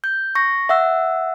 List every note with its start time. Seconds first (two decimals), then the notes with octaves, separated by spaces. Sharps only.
0.04 G6
0.35 C#6 A#6
0.69 E5 F#5 E6